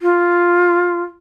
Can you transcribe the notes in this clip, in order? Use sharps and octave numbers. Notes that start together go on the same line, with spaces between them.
F4